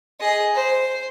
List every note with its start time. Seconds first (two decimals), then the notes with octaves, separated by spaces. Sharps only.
0.20 G#4 D#5
0.55 C5